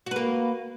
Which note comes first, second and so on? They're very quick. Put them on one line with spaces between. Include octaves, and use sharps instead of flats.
F#4 B4 A#3